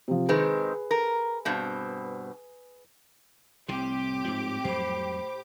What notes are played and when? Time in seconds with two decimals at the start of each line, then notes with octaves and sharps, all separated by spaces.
0.08 C3 F3
0.29 D#3 G#3 C4 G#4 B4
0.91 A#4
1.45 G2 B2 C4
3.68 C2 A2 C3 C4 G4 D6
4.25 G#2 F3
4.65 F2 F#3 G3 C5 B5